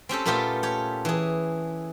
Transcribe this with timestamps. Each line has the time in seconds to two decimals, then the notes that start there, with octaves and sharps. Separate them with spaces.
0.09 C4 C#4 G4 A4
0.25 A#2 A3 B3 F4 G4 A4
0.63 G4 C#5
1.05 E3 G#4